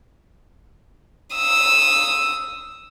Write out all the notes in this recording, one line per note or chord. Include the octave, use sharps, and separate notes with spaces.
D#6 E6